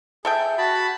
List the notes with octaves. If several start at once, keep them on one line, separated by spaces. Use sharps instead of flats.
G#4 A4 E5 G5
F#4 A5 B5